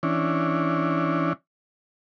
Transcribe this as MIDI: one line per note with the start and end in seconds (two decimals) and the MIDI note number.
0.03 1.33 52
0.03 1.33 61
0.03 1.33 62